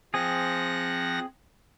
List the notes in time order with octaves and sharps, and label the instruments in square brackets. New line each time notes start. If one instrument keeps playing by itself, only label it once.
[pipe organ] F3 F#5 A#6 [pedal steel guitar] C4 G#4